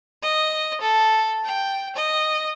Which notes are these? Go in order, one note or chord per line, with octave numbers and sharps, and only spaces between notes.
D#5
A4
G5
D#5